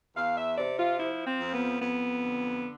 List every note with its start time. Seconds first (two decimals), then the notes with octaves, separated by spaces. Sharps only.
0.16 E2 F5
0.36 E5
0.57 C3 D5
0.78 F4
0.98 F3 E4
1.26 C4
1.40 F2
1.53 B3
1.81 F2 B3
2.22 D3